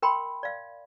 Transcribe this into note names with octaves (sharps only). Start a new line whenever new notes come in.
A#4 G5 B5 C6
D5 F5